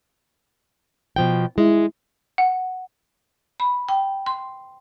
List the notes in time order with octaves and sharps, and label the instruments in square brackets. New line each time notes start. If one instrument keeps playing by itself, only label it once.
[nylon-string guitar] B2 F3 G5
[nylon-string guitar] G#3 [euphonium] E4
[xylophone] F#5
[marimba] B5
G5
C6